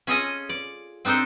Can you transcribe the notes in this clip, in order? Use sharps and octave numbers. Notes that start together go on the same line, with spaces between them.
C#4 F4 G#4 A4 D#5
D5
C4 D4 D#4 A4 C5